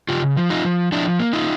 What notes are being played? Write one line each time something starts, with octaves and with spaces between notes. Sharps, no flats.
C#3 F4 G4
F3
D#4 F4
F3
F3 D4 E4
A#3
D#4 F4